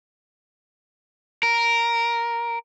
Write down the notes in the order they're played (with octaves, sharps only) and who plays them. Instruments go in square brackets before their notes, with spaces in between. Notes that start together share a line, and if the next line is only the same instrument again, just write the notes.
[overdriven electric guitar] A#4